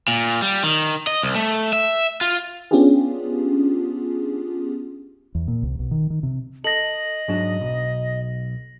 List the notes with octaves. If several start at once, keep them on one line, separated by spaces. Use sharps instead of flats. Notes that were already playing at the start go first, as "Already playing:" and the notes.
A#2
G3
D#3
D#5
C2
A3
E5
F4
B3 C#4 D4 F4 G4 G#4
E2
A#2
C2
B1
D#3
D#3
C3
A4 D#5 A#6 F#7
G#2 F#3 D4
B1